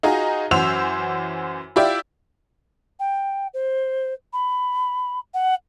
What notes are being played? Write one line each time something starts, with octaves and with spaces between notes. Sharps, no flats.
D#4 F4 F#4 G#4 A#5
F#2 E3 F#4 C5 E6 F7
E4 F4 G4 D5 E5
G5
C5
B5
F#5